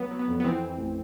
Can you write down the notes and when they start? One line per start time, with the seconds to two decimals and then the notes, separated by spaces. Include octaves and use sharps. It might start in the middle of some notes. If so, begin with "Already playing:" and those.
Already playing: C2 F#3 B3
0.11 F#3
0.19 B3
0.28 F2
0.40 B3
0.44 E3 C4
0.61 E3
0.78 A1